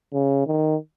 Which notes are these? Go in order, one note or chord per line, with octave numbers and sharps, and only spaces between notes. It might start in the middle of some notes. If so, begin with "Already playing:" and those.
C#3
D#3